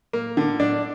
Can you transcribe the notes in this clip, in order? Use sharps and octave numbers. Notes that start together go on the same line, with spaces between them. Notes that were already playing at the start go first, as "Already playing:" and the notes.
A#3
D3
D4